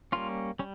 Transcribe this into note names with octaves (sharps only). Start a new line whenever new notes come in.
G3 A#3 C#4 F4
G3 C#4